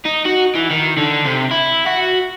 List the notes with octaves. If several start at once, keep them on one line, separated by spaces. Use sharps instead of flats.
D#4
F#4
E3
D#3
D3
C3
E4
F#4